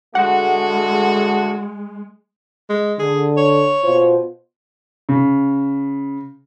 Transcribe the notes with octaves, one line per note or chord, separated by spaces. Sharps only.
D3 G#3 A3 F#4 F#5
G#3
D3 G#4
C#5
B2 F4 C5
C#3